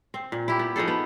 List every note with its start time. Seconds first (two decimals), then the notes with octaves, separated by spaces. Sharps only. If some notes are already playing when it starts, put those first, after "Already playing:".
0.14 C4
0.32 A#2
0.48 E4 G4
0.59 B3
0.76 F3 D#4 G#4 A4
0.88 B3